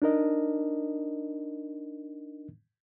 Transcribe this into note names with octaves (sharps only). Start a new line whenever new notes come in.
D4 D#4 A#4 D#5